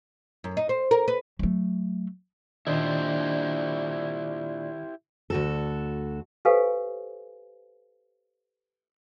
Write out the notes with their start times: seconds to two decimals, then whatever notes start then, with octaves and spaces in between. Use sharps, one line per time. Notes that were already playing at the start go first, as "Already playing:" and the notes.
0.44 F#2
0.57 D#4
0.69 C5
0.91 A#4
1.08 B4
1.39 F#3 A3
2.67 A#2 D#3 D4 E4 G4 C5 D#5
5.30 D2 F#4 A4
6.45 G4 A4 B4 C5 F5 G#5